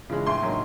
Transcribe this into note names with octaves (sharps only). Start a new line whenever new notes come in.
C#3 E3 G#3
A2 C6
F#3 A#3 D#4